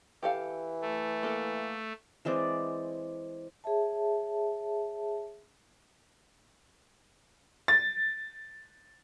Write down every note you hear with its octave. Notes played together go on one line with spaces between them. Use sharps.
E3 G4 A4 F5
A3
A#3 A4
E3 G#3 C4 D5
G#4 C#5 E5 A5
A6